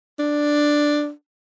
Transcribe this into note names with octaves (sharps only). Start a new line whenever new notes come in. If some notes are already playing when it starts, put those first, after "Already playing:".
D4